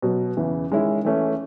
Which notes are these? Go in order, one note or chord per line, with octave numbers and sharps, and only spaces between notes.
B2 F#3 B3 F#4
E2 C#3 E3
D#3 G#3 C#4 E4
E3 A3 C#4